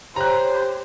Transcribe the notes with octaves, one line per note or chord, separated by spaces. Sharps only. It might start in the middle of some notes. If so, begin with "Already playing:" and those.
G4 C5 C#5 A#5 F#6